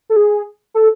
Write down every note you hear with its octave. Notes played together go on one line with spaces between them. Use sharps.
A4
G#4
A4